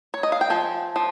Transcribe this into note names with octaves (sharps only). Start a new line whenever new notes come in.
C#5
D#5
F5
G5
F3 G#5
F3